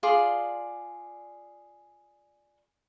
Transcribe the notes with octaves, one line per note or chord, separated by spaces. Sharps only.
F4 G#4 D5 C6